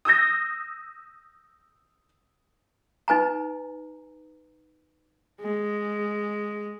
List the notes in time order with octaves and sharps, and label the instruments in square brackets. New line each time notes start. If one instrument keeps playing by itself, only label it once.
[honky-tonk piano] D#6 E6 G6 A#6
[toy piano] D#4 B4 G#5 A#5
[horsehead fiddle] G#3